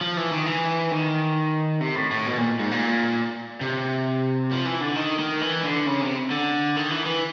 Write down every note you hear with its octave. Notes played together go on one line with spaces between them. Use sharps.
F3
E3
D#3
E3
D#3
C3
A2
A2
B2
A#2
G#2
A#2
C3
F3
E3
D3
D#3
D#3
E3
D3
C#3
C3
D3
D#3
E3
E3